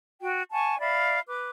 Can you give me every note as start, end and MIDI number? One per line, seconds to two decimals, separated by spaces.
0.21 0.43 66
0.21 0.43 79
0.52 0.79 78
0.52 0.79 80
0.52 0.79 81
0.52 0.79 85
0.80 1.20 74
0.80 1.20 76
0.80 1.20 77
0.80 1.20 83
1.27 1.50 71
1.27 1.50 86